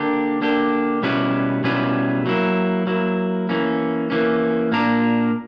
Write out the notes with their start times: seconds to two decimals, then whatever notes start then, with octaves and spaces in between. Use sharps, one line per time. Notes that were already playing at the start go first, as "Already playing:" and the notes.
Already playing: D3 A#3 D4 G4
0.41 D3 A#3 D4 G4
1.03 B2 G3 C#4 E4 B4
1.64 B2 G3 C#4 E4 B4
2.26 F#3 A#3 E4
2.87 F#3 A#3 E4
3.49 E3 A#3 C#4
4.10 E3 A#3 C#4
4.72 A#2 A#3 D4 A#4